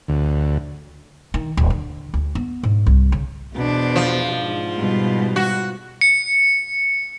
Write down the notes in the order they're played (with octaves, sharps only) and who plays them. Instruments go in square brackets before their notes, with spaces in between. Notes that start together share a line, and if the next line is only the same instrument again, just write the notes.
[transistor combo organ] D2
[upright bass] D#3
D1
D3
D2
B3
G#2
C2
C#3
[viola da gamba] E2 D4 C5 [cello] B2
[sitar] F3
[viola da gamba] G#2 F4
[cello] B2 G3
[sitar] F#4
[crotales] C#7